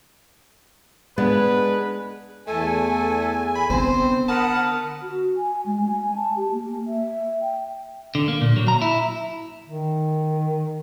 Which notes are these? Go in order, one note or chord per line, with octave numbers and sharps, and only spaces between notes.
G#3 B3 D4 B4
E2 A3 A4 G#5
B5
D3 B3 C4 C5
A#4 F#5 A5 B5 D#6
F#4
G#5
G#3
G#5
A5
G4
A#3
E5
G5
D3
A#3
A#2
F#3
A#5
E4
D#3